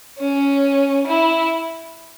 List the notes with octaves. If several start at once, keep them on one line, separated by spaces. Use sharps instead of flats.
C#4
E4